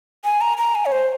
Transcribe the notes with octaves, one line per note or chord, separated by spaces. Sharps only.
G#5
A#5
A#5
G#5
C#5
C5